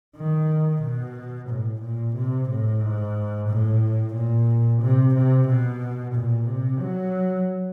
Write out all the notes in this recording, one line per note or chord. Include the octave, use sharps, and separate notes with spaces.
D#3
B2
A2
A#2
C3
A2
G#2
A2
A#2
C3
C3
B2
A#2
C3
F#3